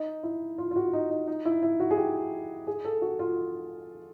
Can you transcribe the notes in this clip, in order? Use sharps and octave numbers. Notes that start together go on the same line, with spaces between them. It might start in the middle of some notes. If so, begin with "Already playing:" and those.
Already playing: D#4
E4
F4
F4
F#4
D#4
D#4
D#4
E4
E4
F#4
G#4
G4
G#4
A4
F#4
F4